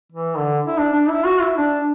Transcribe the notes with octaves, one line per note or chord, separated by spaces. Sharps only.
E3
D3
E4
D4
D4
E4
F#4
E4
D4